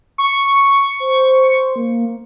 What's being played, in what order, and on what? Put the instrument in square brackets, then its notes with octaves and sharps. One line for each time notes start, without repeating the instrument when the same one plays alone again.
[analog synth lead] C#6
[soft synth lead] C5
A#3